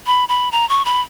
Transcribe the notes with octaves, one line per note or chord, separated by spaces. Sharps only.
B5
B5
A#5
C#6
B5